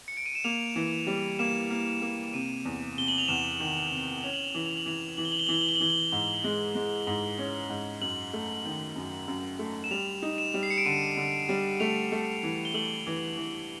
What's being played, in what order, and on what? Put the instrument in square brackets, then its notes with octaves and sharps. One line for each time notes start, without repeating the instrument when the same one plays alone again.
[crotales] C#7
D7
D#7
E7
[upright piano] A#3 [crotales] F7
[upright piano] E3
G3
[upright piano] A#3 [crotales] E7
[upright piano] A#3
A#3
[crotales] E7
[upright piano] C3 [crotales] D#7
[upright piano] E2
[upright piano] C3 [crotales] G7
[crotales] F#7
F7
[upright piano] E2 [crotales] E7
[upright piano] D#3
C3
[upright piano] C#4 [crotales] F7
[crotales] F#7
F7
[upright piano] E3 [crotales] F#7
[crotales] F7
F#7
[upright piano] E3 [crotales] F7
[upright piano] E3 [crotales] F#7
[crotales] G7
F#7
G7
[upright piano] E3 [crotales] F#7
[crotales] G7
F#7
G7
F#7
[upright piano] E3 [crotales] G7
[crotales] F#7
[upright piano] G#2 [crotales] G7
[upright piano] G#3
G#3
[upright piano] G#2 [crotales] F#7
[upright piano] C#4
G#2
[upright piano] F#2 [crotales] F#7
[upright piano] A3
D#3
F#2
F#2
A3
[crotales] E7
[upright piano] G3 [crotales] F7
[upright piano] D#4
[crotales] E7
[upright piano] G3
[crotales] C7
C#7
D7
[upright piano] D3 [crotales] D#7
[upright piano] D3
G3
[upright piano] A3 [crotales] F7
[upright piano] A3
E3
[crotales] G7
[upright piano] A3 [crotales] F#7
[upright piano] E3
E3